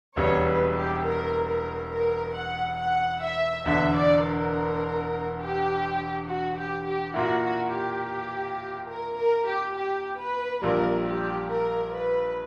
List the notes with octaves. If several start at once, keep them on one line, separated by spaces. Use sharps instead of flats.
E1 E2 C#3 G3 B3 C#5
B4
G4
A#4
A#4
A#4
F#5
F#5
E5
E1 E2 D3 E5
D5
A#4
G4
F#4
G4
G4
A#2 A#3 E4 F#4
F#4
G4
A#4
A#4
G4
G4
B4
A#1 A#2 G3 A#4
G4
A#4
B4